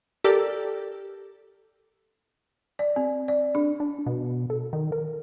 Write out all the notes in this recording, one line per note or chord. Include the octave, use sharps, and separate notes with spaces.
G4 A4 A#4 D5
D5
C4
D5
D4
D4
B2
A4
D#3
A#4